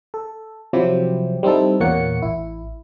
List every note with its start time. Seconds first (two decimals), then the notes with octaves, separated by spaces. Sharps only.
0.14 A4
0.73 C3 F3 F#3 C4 E4 G4
1.43 G3 C4 D#4 E4 A4
1.80 E2 A#2 A#3 C#5 F#5 C#7
2.22 A1 E4